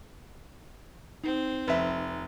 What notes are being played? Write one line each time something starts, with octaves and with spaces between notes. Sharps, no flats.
C4 D#4
F1 B4 E5